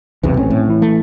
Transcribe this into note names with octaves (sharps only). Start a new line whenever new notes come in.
B1 E2 C3 B4
A1 C4 C#4 C#5
A2
E3 E4
A3